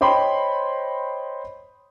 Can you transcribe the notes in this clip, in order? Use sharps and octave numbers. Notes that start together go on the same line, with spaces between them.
C5 C#5 D#5 G5 B5 C6